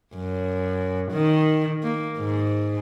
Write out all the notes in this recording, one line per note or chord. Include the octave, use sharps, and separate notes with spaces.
F#2
D#3
A#3
G#2